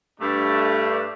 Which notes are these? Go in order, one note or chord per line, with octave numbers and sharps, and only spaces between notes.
G2 A3 D4